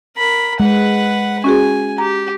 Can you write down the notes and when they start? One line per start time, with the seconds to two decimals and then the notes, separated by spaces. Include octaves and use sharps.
0.17 A#4 B5
0.60 G#3 B4 F#5
1.44 C#4 F#4 G#4 G#5
1.98 G4 A#5